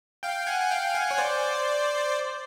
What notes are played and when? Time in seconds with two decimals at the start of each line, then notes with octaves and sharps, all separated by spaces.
0.23 F5 G5
0.47 F#5 G#5
0.61 G#5
0.70 F5 G5
0.95 F#5 G#5
1.11 C#5
1.18 C5 D5